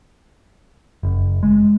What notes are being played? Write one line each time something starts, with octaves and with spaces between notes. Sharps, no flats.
F#1
G#3